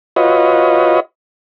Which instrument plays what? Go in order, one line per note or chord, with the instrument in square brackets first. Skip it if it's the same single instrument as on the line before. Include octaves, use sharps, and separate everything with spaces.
[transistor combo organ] F4 F#4 B4 C#5 D#5